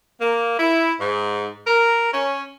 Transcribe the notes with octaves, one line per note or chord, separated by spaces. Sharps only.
A#3
E4
G#2
A#4
C#4